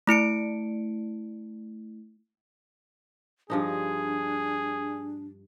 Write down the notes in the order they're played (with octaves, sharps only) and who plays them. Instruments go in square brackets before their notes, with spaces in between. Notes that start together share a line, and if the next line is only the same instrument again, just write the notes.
[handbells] A3 E4 C#7 D7
[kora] G2 F3 D#4 [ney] D4 [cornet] G#4